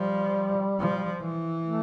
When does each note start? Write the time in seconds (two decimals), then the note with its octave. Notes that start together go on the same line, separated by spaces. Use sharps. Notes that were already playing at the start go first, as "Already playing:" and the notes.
Already playing: F3 G3
0.80 F3
1.22 E3
1.65 A3